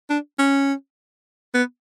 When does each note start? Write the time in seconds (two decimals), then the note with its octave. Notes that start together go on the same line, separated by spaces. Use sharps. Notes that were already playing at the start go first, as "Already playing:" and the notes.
0.10 D4
0.39 C#4
1.54 B3